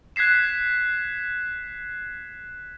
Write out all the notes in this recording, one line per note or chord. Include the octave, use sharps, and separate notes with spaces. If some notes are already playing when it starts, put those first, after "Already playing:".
F#6 G#6 B6 C7 E7